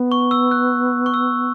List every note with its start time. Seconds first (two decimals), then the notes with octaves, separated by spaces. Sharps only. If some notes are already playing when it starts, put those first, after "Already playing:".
Already playing: B3
0.12 C#6
0.31 E6
0.51 F#6
1.06 C#6
1.14 E6